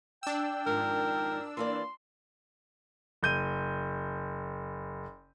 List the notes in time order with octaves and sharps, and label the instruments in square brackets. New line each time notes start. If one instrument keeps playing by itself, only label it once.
[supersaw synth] D4 E6 [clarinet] G5
[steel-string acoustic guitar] F2 G#2 D#3 [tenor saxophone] A#4
[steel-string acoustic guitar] E3 A#3 D5 [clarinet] C6
[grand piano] F#1 G6 D#7